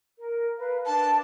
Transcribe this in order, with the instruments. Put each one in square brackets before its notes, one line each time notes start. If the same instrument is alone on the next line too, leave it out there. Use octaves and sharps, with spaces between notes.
[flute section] A#4
B4 F5
[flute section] D4 [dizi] A5